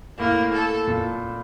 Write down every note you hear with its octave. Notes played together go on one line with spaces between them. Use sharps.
A2 A#3
A4
A#2